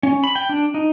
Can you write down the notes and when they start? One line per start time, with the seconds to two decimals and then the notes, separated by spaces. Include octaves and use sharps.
0.03 C#4
0.24 B5
0.36 G5
0.49 D4
0.74 D#4